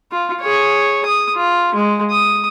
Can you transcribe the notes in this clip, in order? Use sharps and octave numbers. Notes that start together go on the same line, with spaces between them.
F4
G#4 C#5
D#6
F4
G#3
D#6